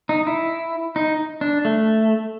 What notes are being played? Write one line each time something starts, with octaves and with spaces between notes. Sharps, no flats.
D#4
E4
D#4
D4
A3